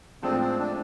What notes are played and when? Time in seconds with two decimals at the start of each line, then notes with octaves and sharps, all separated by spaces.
0.23 A2 F3 G#3 C4 D4 A4
0.40 C4
0.58 D4